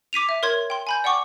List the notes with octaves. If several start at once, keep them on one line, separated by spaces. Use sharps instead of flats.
D6 B6 D#7 F7
E5
A#4 C#5 C6 G#6
G5 C6
G#5 B5 G6
D5 F#5 G5 C#6 D6